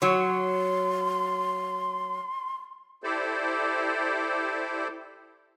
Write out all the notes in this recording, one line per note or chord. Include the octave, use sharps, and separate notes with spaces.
F#3 C#5 C6
E4 G4 A4 C5 D5